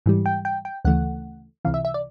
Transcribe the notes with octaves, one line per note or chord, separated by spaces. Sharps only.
G#2 E3 G3
G5
G5
G5
D2 C#3 E3 A3 F#5
C#2 C3 E3 F5
E5
E5
D5